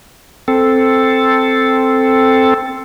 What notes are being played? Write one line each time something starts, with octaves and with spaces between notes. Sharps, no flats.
C4 A4